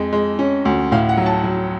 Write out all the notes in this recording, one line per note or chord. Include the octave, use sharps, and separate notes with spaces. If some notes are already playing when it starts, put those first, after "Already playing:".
Already playing: F2 G#3
G#3
C#4
D2
A2 F5
F#5
F#3
A5
F#3